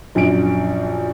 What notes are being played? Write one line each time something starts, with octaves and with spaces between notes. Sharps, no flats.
A#1 F#2 D4 D7